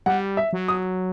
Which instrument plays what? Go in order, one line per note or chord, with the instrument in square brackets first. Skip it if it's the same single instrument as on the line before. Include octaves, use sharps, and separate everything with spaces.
[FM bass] G3 [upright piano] F#5
[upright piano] E5
[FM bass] F#3
[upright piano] D#6